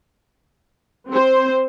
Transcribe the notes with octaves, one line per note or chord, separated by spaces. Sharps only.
C4 C5